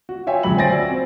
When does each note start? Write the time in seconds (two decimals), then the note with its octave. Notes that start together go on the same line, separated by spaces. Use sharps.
0.09 F#4
0.27 F4 C#5 E5 G5 G#5
0.43 D1 C#2 F#3 B5 F#7
0.57 C5 G5 G#5 A6 A#6 D7
0.70 F#4 D5 G#5 E6
0.90 C4